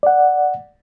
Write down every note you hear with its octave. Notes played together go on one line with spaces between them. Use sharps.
D5 F#5